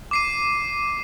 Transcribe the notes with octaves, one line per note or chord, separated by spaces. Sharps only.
D6 C7 D#7